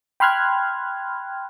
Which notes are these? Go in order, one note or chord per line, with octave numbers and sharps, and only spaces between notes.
G5 B5 C6 F6 F#6 G#6